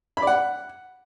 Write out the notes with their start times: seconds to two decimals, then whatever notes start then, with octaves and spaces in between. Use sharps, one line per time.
0.17 B5
0.22 D5
0.27 F#5